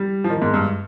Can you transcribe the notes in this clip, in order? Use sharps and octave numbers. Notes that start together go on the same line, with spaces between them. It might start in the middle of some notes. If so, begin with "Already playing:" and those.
Already playing: G3
F3
D#3
G#2
G2